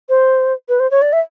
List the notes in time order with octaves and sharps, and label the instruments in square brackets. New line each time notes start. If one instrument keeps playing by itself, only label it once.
[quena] C5
B4
C5
C#5
D5
E5